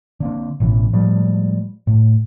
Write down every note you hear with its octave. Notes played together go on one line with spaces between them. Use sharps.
D3 A#3 C4
A1 B2 E3
A2 F3 G3 G#3
A2